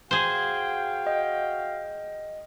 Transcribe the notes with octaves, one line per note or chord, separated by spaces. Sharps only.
F#4 G#4 C5 F5 G5
D#5